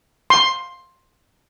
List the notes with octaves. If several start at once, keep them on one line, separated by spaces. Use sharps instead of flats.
C6